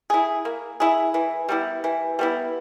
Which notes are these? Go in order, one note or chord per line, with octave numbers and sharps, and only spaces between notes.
E4 G#4
A#3
E4 G#4
E3
G3 B3 E4
E3
G3 B3 E4